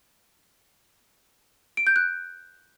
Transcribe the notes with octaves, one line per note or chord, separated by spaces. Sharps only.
D7
G6
F#6